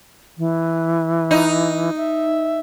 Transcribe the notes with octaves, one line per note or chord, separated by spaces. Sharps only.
E3
D#4
E5